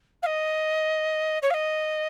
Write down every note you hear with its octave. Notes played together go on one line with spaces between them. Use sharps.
F5
D#5
C#5
F5
D#5